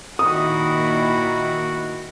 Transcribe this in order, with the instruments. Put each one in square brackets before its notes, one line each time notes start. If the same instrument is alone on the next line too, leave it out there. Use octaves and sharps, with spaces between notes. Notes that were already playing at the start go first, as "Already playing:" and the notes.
[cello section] A#2 D#3 E4 [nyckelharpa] F#4 [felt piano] D#6